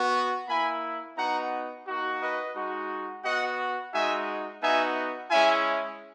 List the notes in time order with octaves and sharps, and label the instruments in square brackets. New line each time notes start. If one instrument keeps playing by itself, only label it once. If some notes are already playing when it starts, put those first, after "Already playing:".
Already playing: [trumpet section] B3 F#4
A#3 E4 G#5 B5
B3 D#4 F#4 F#5 A#5
A#3 D#4 F#4
B4 D#5
G#3 D#4 F#4
B3 F#4 D#5 F#5
G#3 D#4 F#4 E5 G#5
B3 D#4 F#4 E5 G#5
G#3 C#4 E4 E5 G#5